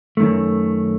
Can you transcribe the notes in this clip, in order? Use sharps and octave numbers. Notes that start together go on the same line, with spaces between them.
F#2 D#3 A3